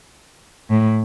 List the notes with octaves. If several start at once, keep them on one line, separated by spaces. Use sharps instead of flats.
A2